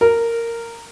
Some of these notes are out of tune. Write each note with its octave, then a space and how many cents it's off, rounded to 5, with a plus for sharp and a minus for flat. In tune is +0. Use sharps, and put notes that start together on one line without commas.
A#4 -10